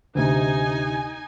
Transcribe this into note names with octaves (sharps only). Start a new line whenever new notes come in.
D2 C3 D#4 G#5